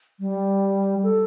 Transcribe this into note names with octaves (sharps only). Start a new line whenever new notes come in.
G3
A4